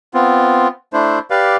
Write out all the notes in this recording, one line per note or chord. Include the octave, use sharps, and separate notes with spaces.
B3 C4 F4
A3 D4 E4 C5
G4 B4 D5 F5